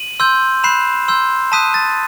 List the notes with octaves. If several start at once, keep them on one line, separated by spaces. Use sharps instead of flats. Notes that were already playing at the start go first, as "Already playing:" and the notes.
Already playing: D#7 F#7
C6 E6 G6
B5 F#6 C7 E7
C6 E6 G6
A5 D#6 F#6 B6 D#7
A6